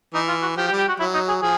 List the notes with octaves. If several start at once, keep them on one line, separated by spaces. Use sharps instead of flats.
E3 D#4
F4
F#4
F3 G4
G4
G3
G4
F#4
F#3 E4
D#4
G#4
F3 G#4